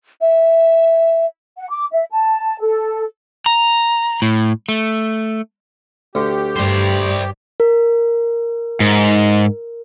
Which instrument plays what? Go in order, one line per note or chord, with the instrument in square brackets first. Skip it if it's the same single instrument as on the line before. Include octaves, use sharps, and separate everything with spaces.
[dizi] E5
[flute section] F#5
D6
E5
A5
A4
[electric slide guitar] A#5
A2
A3
[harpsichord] D2 D3 [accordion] G4
[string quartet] G2 [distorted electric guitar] C5 D5
[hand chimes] A#4
[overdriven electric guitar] G#2